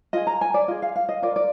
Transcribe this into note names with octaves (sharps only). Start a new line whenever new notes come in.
F4 G#4 D#5
A#5
G#5
D5
F4 G#4 D#5
F5
F5
D#5
F4 A#4 D5
D5